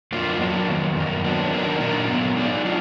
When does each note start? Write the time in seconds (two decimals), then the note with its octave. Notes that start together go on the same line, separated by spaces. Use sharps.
0.12 F2 D3 F#3 A#3 F4
0.41 F#3 A#3 D4
0.68 F2 D#3 F#3 B3
0.96 F#2 D#3 A#3
1.24 F#3 B3 D4
1.53 D#3 A#3 D4
1.80 A#2 F#3 D4 F#4 A#4
2.08 D3 F#3 B3
2.36 G#3 D#4 G#4 D5
2.65 F#3 D4 F4